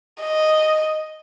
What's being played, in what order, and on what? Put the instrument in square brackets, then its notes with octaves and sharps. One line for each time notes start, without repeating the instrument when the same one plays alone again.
[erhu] D#5